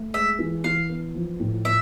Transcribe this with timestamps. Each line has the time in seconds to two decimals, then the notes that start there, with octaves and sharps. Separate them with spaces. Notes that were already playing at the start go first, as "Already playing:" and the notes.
Already playing: A3
0.13 G#3 E5
0.39 E3
0.64 E3 F5
0.89 B3
1.15 F3
1.40 A2
1.65 A2 E5